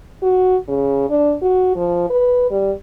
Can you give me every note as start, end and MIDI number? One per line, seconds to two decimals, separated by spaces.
0.22 0.56 66
0.68 1.05 49
1.10 1.34 62
1.42 1.72 66
1.76 2.08 53
2.10 2.48 71
2.51 2.72 55